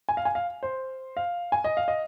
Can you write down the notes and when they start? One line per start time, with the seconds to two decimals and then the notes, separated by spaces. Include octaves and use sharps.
0.09 G#5
0.17 F5
0.25 G#5
0.35 F5
0.63 C5
1.17 F5
1.52 G#5
1.64 D#5
1.77 F5
1.88 D#5